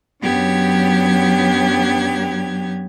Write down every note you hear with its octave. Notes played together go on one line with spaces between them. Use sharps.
F#2 F#3 B3 D4 G4 G#6